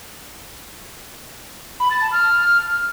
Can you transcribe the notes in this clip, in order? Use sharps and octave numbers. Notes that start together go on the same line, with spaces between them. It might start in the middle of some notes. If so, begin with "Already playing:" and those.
B5
A6
A5
F6